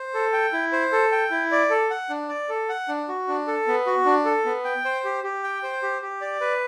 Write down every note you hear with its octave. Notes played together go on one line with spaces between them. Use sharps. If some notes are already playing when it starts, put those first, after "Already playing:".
Already playing: C5
A4
G5
E4
C5
A4
G5
E4
D5
A4
F#5
D4
D5
A4
F#5
D4
F#4
D4
A4
B3
F#4
D4
A4
B3
G5
C5
G4
G4
G5
C5
G4
G4
D5
B4